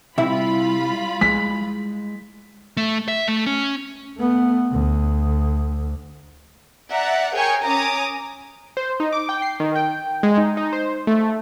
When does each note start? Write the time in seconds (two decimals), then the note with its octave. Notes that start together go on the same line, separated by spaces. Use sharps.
0.18 C3 G3 E4 F4 E5 B5
1.21 G#3 B6
2.77 A3
3.08 E5
3.28 A3
3.46 C#4
4.18 A3 B3
4.72 D2
6.91 D5 E5 F#5 A#5
7.33 G#4 A#4 C#5 G5 G#5 C#6
7.65 C#4 G#5 A#5 D6 D#6
8.77 C5
9.00 D#4
9.13 D6
9.29 G5
9.42 C7
9.60 D#3
9.75 G5
10.23 G#3
10.38 D#4
10.57 D#4
10.73 C5
11.07 A3